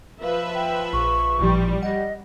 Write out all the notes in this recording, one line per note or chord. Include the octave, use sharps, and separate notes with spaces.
F3 B4 E5 F5
G5
A#1 C#6
A1 A#2 F3 G3
D#5 F#5